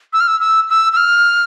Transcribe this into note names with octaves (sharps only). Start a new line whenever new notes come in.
E6
F6
E6
E6
E6
E6
F6